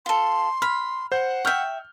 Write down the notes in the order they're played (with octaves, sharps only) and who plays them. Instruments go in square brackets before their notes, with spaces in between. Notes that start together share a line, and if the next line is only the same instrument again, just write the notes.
[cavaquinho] F4 A4 [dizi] C6
[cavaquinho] B5 [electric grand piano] F6
[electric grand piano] C5 G6 [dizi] F#5
[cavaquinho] E5 G5 [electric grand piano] C#6 F6 G6